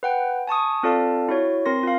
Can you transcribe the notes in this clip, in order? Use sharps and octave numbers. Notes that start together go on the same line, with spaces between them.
B4 F#5 G5
G#5 A5 C#6 D#6
C4 F4 A4 D5 F5 A5
E4 F#4 C#5
C4 A#4 C6 A#6
F4 F5